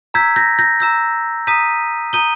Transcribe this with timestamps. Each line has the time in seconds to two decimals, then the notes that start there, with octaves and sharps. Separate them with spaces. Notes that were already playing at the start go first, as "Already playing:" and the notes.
0.14 A#5 E6 G6 G#6 B6
0.36 G6 A#6
0.59 G6 A#6
0.80 A#5 E6 G6
1.47 A#5 D#6 G6 B6 D#7
2.13 A#5 D#6 G6 D#7 G7